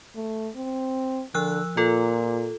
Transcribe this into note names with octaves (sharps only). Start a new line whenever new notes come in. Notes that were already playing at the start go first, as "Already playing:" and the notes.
A3
C4
D3 F3 E6 F#6
A#2 F4 A4